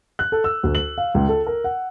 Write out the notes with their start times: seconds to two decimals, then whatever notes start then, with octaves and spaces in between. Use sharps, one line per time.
0.19 F#6
0.32 A4
0.44 E6
0.63 D2
0.75 F#7
0.98 F5
1.14 C#2
1.29 A4
1.47 A#4
1.64 F#5